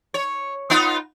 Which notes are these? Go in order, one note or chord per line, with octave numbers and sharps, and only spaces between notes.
C#5
B3 D#4 F4